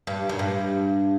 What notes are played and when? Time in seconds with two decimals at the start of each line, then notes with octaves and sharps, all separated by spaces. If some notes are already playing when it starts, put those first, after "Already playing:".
0.07 G2
0.29 F#2
0.39 G2